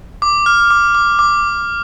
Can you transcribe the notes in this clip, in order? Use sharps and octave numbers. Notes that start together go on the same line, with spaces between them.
D6
F6
D6
D6
D6